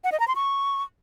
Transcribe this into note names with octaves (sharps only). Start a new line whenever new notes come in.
F#5
D#5
A#5
C6
C#6